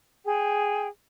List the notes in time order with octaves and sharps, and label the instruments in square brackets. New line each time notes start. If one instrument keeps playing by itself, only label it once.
[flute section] G#4 G5